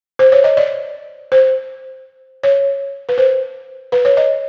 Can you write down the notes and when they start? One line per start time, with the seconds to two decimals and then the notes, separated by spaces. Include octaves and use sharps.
0.19 C5
0.32 C#5
0.44 D#5
0.57 D5
1.32 C5
2.43 C#5
3.09 B4
3.18 C5
3.92 B4
4.05 C#5
4.17 D#5